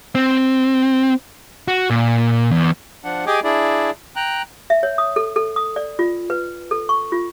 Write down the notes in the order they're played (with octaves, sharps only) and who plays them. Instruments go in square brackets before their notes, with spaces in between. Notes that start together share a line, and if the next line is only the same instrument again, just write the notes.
[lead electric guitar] C4
F#4
A#2
E2
[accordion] F3 D4 F#5
G4 G#4 D#5 G5 G#5 D6
D4 E4 G#4 D5
G5 A#5 F#6
[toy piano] E5
C#5
D#6
A4
A4
D#6
D5
F4
B4
A4
C#6
F4